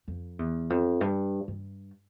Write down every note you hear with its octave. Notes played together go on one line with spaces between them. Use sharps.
F2
E2
F2
G2
G2